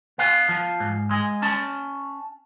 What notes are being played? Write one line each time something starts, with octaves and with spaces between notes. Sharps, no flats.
B3 F5
F3
G#2
G#3
C#4 A5